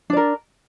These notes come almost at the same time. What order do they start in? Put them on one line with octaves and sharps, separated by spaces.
D4 D5 A#4